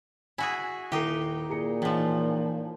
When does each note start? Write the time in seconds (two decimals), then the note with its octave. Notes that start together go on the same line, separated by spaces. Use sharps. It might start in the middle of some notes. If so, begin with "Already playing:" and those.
0.38 E4 F#4 G#4 G#5
0.92 D#1 D#4 E4 G4 A4 C7
1.50 A#2 G#4 A#5 C#7
1.82 A2 E3 F3 D#4